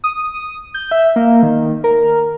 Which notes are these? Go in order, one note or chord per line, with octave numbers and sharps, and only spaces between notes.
D#6
G6
E5
A#3
D#3
A#4